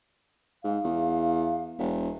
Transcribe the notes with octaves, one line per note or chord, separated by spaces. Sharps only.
G#2 F5
E2
E1